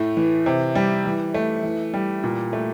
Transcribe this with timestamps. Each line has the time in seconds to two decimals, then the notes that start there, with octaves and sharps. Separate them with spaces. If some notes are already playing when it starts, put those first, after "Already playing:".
Already playing: A2 A3
0.17 E3
0.46 C3
0.75 G3
1.05 E3
1.34 A3
1.63 E3
1.94 G3
2.24 A#2
2.53 A3